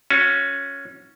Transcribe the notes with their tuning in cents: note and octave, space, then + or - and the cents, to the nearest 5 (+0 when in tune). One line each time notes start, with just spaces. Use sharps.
C#4 +0 F#4 -40